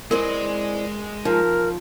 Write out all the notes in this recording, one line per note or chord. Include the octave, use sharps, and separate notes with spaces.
E3 G#3 C4 A#4 D5 D#5
F3 D#4 A#4